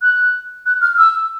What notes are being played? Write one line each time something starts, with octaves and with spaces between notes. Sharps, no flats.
F#6
F#6
F6
E6